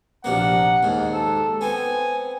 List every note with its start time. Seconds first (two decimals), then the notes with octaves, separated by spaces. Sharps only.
0.24 A#1 C3 A#3 F#5
0.83 D#2 G#2
1.13 A4
1.61 B3 C4 G#5